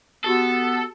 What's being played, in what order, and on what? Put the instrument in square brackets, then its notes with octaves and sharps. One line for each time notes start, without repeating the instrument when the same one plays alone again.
[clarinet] B3 [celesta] F#4 G4 G7 [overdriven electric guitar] A4